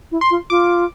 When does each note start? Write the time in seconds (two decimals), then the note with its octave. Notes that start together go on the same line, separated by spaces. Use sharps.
0.11 E4
0.21 C6
0.30 F4
0.50 F4 D6